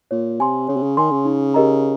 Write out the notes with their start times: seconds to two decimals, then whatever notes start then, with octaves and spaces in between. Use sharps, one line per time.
0.11 A#2 C#5
0.40 C3 G#5 C6
0.69 C#3 C#5
0.76 C3
0.83 C#3
0.97 D#3 G#5 C6
1.11 C#3
1.25 D#4
1.54 G4 A#4 D#5 A#5